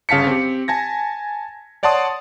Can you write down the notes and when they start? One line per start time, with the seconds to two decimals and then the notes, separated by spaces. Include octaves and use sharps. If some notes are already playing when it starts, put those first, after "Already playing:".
0.09 G1 C#3 F5 A5 B6 C#7
0.27 C4 G4
0.68 G#5 A5 G#6 A#6
1.83 C#5 D5 F#5 A5 C6 D#6